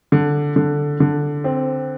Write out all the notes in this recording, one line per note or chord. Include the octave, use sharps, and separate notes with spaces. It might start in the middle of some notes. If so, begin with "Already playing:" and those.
D3
D3
D3
C4